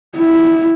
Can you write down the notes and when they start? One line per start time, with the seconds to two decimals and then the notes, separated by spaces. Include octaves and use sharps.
0.17 E4